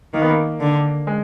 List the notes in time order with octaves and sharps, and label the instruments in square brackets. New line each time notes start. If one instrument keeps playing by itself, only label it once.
[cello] D#3 [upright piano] A#3
[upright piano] B3
A#3
[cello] D3
[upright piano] G#3